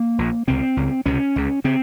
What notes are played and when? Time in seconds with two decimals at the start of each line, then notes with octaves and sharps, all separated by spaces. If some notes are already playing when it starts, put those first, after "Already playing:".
Already playing: A#3
0.18 A#1 A#2
0.47 C#2 C3 C4
0.77 C#2 C#3
1.06 C#2 C3 C#4
1.36 C#2 C#3
1.64 C#3 C4